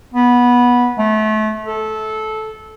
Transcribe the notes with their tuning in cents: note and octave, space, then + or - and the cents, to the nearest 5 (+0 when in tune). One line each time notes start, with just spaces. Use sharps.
B3 -15
A3 -30
A4 -15